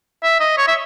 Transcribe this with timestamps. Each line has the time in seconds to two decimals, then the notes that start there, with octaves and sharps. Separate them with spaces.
0.23 E5
0.40 D#5
0.58 C#5
0.67 E5